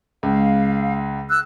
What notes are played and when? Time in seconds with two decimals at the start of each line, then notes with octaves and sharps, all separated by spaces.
0.23 C#2 F5
1.29 E6 F#6